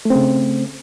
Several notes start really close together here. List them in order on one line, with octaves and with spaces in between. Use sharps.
A3 C4 C#3